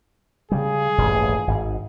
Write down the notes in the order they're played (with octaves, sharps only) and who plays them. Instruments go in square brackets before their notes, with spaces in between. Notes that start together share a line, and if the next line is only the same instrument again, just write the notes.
[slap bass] C#3 G3 [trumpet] G#4
[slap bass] D#1 A1 G2
G#1 G#2